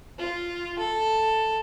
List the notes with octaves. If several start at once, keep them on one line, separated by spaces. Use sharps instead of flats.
F4
A4